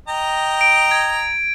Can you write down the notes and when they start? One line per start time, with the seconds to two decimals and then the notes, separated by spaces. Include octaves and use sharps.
0.08 D#5 G5 A#5
0.61 D7
0.91 G#6